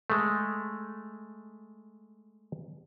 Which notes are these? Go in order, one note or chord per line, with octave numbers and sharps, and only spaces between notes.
G#3 A3